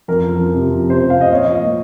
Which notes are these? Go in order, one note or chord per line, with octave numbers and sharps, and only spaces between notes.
F2 A#4
F3
F3
C3
F3
C3 C5
C3
F5
C3
D#5
A#2 C#5
F3 D#5
A#3